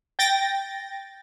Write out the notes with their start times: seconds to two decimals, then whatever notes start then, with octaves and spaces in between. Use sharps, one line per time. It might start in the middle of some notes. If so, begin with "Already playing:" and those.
0.19 G5 A6 A#6